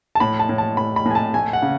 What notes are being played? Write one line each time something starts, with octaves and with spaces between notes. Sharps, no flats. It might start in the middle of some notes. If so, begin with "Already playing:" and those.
A5
A2 B5
A5
A2
A5
A2 B5
B5
A2 G#5
A5
A3 G#5
F#5
C#3